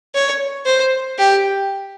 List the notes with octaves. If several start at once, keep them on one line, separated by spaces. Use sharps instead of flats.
C#5
C5
G4